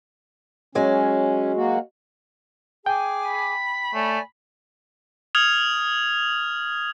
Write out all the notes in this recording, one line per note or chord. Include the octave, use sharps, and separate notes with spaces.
F#3 G#3 C#4
A#3 F#4
G#4 G5 G#5 D6
B5
A3 C#5 D5 G#5
D#6 F6 G#6 F7